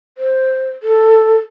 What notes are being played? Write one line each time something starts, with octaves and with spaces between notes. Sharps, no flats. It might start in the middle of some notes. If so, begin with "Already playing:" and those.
C5
A4